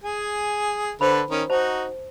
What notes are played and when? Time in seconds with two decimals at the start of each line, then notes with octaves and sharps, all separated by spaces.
0.04 G#4 G#5
1.01 D3 A4 B4 C5 B5
1.31 D#3 C#4 A#4
1.50 D#4 F#4 C5 A5